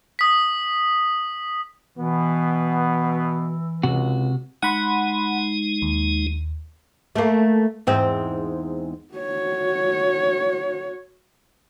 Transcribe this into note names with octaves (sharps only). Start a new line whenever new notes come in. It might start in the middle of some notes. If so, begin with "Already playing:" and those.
D#6 B6
B2 E3 B3
C#2 C3 F#4
G#3 D#4 F#5 B5 C6
D#2
A3 A#3
E2 G#2 C4
F#4 C#5